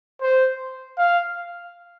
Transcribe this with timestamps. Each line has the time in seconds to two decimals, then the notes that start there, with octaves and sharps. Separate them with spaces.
0.22 C5
0.98 F5